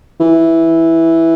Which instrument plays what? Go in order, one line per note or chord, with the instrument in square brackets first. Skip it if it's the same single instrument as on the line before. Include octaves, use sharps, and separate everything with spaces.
[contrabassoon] E3